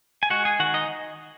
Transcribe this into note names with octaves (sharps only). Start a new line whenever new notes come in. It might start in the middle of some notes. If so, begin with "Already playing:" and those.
G#5
G#3 F#4 F#5
G#4 G#5
D#3 F#4 F#5
D#4 D#5